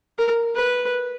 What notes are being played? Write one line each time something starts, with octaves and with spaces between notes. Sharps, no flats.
A#4
B4